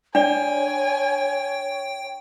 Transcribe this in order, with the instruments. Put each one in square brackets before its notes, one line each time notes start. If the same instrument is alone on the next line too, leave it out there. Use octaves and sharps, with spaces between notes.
[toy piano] D4 D5 [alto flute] C#5 [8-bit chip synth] G5 [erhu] G#5